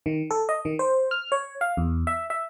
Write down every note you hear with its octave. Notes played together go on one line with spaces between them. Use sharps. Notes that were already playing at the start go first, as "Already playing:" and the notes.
D#3
A4
D#5
D#3
C5
F6
C#5
F5
E2
E5
E5